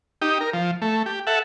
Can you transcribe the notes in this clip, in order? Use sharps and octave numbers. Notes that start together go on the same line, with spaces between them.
D#4 G4
A#4
F3
A3
G4
A4 E5 F#5